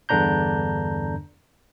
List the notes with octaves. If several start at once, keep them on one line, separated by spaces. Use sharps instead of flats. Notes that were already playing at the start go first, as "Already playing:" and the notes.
E2 G2 D3 D4 A#5 G6